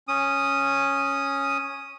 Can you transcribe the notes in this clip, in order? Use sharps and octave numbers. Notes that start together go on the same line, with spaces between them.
C#4 D#6